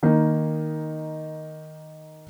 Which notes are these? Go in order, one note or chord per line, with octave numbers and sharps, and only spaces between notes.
D#3 A#3 D#4